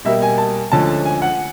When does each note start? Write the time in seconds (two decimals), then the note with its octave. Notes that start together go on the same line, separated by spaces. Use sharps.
0.05 B2 G3 A#3 E5
0.22 G#5
0.38 A5
0.72 D2 D3 F3 G#3 C#4 A5
1.05 G#5
1.22 F#5